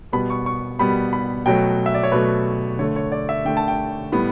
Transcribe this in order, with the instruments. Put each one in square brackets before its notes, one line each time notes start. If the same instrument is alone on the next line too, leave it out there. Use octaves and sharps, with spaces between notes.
[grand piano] B2 G3 B3 B5
C#6
C#6
B2 G3 B3 B5
B5
B2 F#3 A3 G5
E5
D5
C#5
B2 F#3 A3 B4
D3 A3 C#5
C#5
D5
E5
D3 A3 G5
A5
G5
A2 G3 B3